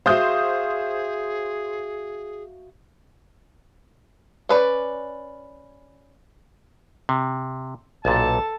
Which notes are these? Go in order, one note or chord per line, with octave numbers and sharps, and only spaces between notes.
F#4 G#4 C5 E5 F5 D#6 G6
C#4 B4 D5
C3
B1 A#2 A4 A5